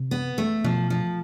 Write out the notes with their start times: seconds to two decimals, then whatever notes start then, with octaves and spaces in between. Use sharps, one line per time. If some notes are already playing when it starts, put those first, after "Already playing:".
Already playing: C3
0.11 B3
0.38 A3
0.64 B2 F3
0.90 F3